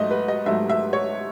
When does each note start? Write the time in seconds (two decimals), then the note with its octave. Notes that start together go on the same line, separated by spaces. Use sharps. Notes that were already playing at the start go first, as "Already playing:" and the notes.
Already playing: G#2 F#3 A3 D#5
0.11 B4
0.28 D#5
0.46 G#2 F#3 A3 E5
0.69 E5
0.93 C#5